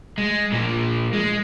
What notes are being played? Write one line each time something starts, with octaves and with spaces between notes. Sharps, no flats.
G#3
A#2 F3
G#3